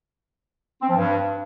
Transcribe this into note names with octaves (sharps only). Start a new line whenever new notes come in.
C4
F3
G2